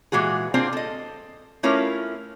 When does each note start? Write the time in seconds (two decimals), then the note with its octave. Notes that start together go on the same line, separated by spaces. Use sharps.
0.12 A#2 E3 G#3 F#4 G#4
0.54 A#3 C4 D4 F4 G#4
0.73 A4 D#5
1.63 A3 C#4 E4 F4 A#4